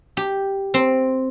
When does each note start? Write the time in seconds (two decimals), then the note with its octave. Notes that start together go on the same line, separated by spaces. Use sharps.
0.17 G4
0.74 C4